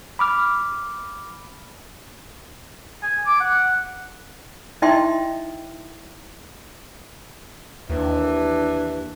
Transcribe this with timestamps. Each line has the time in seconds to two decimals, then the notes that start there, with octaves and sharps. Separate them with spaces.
0.19 B5 D6 F6
3.03 G#5
3.26 D6
3.40 F#5
4.82 D#4 E4 D#5 E5 G5 C6
7.90 D#2 E3 D4